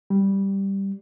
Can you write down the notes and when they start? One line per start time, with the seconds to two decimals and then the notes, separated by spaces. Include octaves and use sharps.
0.10 G3